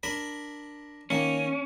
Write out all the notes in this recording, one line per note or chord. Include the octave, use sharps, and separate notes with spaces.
D4 A#4 B5
D#3 A#3 C#4